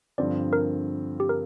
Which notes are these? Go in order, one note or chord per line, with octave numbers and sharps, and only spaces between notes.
G2 D3 F3 C4 D5
A#4
G4
A#4